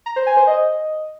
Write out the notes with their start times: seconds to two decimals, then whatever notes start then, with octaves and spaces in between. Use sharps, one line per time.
0.06 A#5
0.16 C5
0.26 G#5
0.37 C5
0.47 D#5